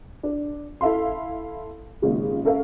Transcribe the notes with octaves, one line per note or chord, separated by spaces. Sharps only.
D4
E4 A4 E5 F5 C6
G#1 A#2 C#3 G4
C#4 A4 A#4 E5 F5